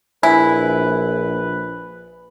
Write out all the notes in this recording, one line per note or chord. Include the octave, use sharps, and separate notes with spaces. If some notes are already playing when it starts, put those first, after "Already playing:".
A#1 E4 B4 G#5